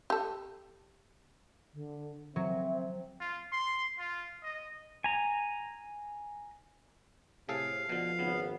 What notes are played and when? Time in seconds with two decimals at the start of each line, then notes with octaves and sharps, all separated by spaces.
0.10 G4 A4
1.74 D3
2.36 F#3 C4 E5
3.20 F4
3.52 C6
3.99 F4
4.43 D#5
5.04 G#5 A#5
7.49 A2 C3 G#4 A4 F5
7.89 B2 D3 F3
8.19 G#1 C#3 B3